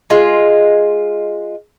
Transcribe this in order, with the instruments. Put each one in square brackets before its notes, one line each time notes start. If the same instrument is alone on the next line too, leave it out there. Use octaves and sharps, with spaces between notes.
[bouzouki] G#3 F4